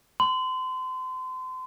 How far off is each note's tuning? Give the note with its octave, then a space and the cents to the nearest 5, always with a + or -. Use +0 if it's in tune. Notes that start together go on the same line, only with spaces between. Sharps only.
C6 -35